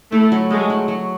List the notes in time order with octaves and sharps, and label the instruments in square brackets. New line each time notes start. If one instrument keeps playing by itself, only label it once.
[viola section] A3 [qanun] E4
[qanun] F#3
[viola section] G#3 [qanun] A3
[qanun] F#3
F#3